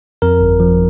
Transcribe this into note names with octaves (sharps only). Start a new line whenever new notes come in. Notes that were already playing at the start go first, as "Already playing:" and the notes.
F2 A#4
G1
F3